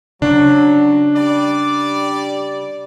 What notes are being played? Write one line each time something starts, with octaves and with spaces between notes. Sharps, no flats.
C#3 F#3 D4
G3 D5